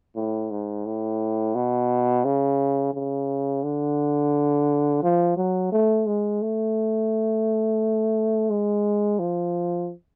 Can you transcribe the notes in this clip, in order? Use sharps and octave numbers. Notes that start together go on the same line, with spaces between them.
A2
G#2
A2
B2
C#3
C#3
D3
F3
F#3
A3
G#3
A3
G#3
F3